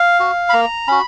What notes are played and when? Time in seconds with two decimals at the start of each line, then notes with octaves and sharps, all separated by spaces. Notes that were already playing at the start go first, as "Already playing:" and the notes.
Already playing: F5
0.20 F#4
0.49 B5
0.53 A#3 A#5
0.88 C#4 F#4 B5